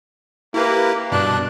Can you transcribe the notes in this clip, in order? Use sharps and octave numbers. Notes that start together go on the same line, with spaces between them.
A#3 E4 G4 B4
G2 B2 D4 F#6